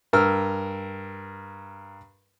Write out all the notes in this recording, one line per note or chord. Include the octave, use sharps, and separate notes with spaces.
G2 A#4 E6 F6